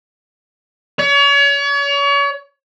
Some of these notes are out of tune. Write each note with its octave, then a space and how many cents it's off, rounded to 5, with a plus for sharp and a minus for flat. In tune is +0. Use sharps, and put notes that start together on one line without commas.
C#5 +35